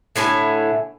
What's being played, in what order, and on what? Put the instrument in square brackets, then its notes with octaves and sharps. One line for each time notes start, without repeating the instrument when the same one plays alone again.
[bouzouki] A2 D3 E4 G#5